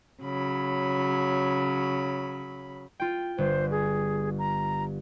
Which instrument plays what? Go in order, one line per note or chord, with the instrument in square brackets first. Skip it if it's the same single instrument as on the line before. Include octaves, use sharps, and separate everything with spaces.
[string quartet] C#3 F#3 B5
[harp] F4 G5
[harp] G1 [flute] C5
[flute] G#4
A#5